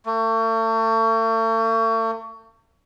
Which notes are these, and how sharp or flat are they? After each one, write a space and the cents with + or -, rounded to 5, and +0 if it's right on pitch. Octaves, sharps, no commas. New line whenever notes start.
A3 +40